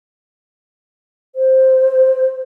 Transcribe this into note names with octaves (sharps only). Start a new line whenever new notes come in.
C5